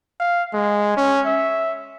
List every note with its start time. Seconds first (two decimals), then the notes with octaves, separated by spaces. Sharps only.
0.20 F5
0.54 G#3
0.97 C#4
1.26 E5